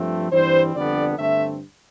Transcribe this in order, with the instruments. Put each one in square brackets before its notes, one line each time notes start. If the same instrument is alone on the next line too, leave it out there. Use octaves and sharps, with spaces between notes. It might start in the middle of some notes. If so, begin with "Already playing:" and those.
Already playing: [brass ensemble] G2 F3 A3 C4
G2 E3 G3 C4 C5
F2 D3 G3 B3 D4 D5
G2 D3 A3 C4 E5